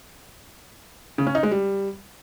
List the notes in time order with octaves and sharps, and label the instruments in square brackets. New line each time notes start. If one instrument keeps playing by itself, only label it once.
[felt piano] C#3
C#4
D#4
G#3
G3